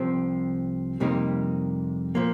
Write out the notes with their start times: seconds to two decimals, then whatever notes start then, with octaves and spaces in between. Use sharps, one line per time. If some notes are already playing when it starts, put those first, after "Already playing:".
Already playing: C2 C3 F3 C4
1.00 F2 C3 G3 A#3 D#4
2.15 A#2 F3 A#3